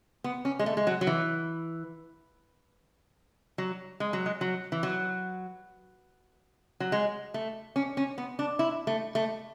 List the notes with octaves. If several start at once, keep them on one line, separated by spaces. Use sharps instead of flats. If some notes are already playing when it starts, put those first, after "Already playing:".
B3
C#4
G#3
A3
G#3
F#3
F#3
E3
F#3
G#3
F#3
G#3
F#3
E3
F#3
F#3
G#3
A3
C#4
C#4
B3
D4
E4
A3
A3